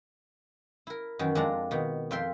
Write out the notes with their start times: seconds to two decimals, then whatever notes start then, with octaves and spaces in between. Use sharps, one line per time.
0.87 E4 A#4
1.19 F#2 D#3 E3 F#4
1.35 F2 G#3 D4 A5 A#5
1.71 B2 D#3
2.11 F2 F4 E5 G5 C6